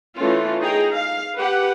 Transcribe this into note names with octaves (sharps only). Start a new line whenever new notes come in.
E3 A3 C#4 F4
D#4 G#4 G5 A#5
F5
G4 B4 F#5